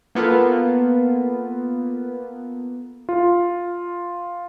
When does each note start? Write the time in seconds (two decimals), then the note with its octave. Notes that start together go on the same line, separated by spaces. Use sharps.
0.15 A#3 B3 F4 A4 B4
3.09 F4